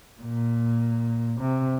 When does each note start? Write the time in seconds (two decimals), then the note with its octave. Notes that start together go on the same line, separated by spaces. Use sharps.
0.22 A#2
1.40 C3